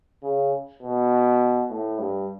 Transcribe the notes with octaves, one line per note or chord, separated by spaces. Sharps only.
C#3
B2
A2
G2